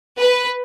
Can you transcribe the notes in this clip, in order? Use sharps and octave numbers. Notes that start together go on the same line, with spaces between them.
B4